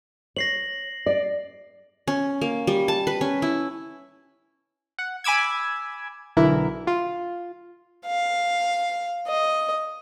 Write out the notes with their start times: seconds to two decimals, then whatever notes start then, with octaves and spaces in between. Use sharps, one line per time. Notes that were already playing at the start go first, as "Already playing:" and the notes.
0.36 C#5 A#6 C7 F#7
1.06 D5
2.08 C#4
2.41 A#3
2.67 G3
2.88 A5
3.07 B4
3.21 C#4
3.42 E4
4.99 F#5
5.24 G#5 B5 D6 E6 G#6
6.37 B1 D3 E3 E4 A#4
6.87 F4
8.06 F5
9.28 D#5